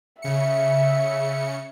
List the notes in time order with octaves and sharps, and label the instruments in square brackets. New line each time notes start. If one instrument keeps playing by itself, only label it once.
[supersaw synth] C#3 C#7 [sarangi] E5